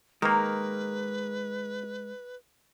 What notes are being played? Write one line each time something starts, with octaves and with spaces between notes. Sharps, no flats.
D#3 G#3 A#3 A#4 B4